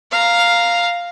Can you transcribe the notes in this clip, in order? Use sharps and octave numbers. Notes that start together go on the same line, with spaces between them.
F5 A#5